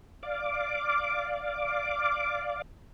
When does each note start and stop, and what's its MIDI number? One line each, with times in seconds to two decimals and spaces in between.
0.23 2.62 74
0.23 2.62 77
0.23 2.62 86